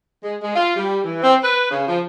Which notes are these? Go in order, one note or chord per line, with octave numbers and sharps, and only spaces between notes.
G#3
G#3
F4
G3
E3
C4
B4
C#3
F3